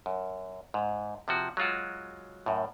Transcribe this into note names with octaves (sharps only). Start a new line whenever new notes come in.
F#2
G#2
C3 F3 F#4
F#3 G#3 F4 F#4
F#2 A2